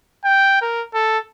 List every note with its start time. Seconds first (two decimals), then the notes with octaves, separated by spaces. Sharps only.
0.25 G5
0.61 A#4
0.94 A4